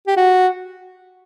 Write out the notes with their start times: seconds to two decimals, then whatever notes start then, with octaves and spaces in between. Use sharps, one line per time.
0.07 G4
0.16 F#4